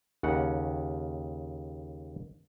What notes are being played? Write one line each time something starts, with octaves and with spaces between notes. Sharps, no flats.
D#2 C#3 F#5